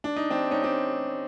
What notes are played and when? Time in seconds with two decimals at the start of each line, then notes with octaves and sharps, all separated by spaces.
0.04 D4
0.16 D#4
0.30 C4 D4
0.51 C#4 D#4
0.64 C4 D4